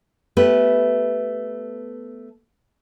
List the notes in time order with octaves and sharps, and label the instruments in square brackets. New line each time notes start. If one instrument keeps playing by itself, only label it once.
[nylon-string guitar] A3 B3 G4 B4